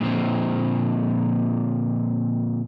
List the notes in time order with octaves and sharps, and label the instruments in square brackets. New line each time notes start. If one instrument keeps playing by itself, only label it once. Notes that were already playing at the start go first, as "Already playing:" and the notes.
[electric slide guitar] A#2 D3 D#3 F3 C4